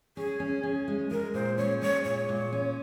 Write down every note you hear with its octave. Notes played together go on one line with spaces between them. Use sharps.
C#4 G#4
C#4
C#4
G#3
G#3 A#4
A#2 C5
C#4 C#5
G#3 C#5
A#2 C#5
A#2
C#4